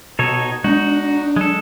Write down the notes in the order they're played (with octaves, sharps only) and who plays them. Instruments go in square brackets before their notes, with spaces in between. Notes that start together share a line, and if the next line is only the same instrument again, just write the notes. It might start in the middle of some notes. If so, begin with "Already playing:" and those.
[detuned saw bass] B2 [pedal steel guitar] D#4 A4 C#5
[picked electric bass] G#3 B3 [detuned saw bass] D4 [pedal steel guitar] D#4 F#4
[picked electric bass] F#3 [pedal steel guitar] G#3 A4